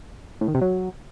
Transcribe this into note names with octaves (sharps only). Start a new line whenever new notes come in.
A2
D#3
C3
F#3